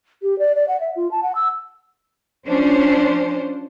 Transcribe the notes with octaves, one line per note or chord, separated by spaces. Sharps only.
G4
D5
D5
F#5
E5
F4
A5
F#5
E6
F3 C#4 D4 C5